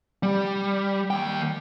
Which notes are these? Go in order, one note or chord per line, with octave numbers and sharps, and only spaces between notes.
G3
D#2 G5